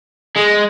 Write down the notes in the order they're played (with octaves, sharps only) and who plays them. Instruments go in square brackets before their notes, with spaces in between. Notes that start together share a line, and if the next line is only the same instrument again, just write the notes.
[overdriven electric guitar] G#3